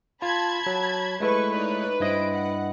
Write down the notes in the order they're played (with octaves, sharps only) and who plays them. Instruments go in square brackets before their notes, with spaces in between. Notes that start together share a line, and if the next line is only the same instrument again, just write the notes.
[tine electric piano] F4 [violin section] A5 B5 G#6
[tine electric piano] F#3
[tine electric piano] G#3 A3 E4 [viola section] B4 [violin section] C#6
[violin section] D#4 C#5 D5
[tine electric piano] G2 E4 D#5 [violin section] C5 D7
[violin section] F#5